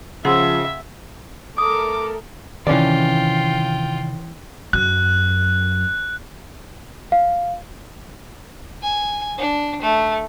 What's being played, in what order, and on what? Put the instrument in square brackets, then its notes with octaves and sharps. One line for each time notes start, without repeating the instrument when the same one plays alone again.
[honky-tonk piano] C#3 [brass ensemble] F3 [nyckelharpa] E5 [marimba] F#5 C6 E6
[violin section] A3 A4 A#4 [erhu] D6 [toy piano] D#6
[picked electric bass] C3 D#3 [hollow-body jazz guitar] E3 C#4 D5 [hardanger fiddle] F4 G5
[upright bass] F#2 [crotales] F#6
[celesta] F5
[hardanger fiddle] G#5
D4
A3